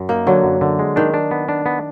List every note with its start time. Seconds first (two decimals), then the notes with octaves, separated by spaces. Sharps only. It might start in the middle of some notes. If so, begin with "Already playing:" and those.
Already playing: F#2
0.09 A#3 D#4
0.27 D3 F#3
0.44 F#2
0.61 D3
0.79 G#3
0.96 D#3 D4
1.14 D4
1.31 B3
1.49 D4
1.66 B3